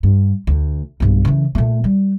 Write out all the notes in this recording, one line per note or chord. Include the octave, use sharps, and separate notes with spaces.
G2
D2
B1 G2
C#3 E3
A#2 A3
G3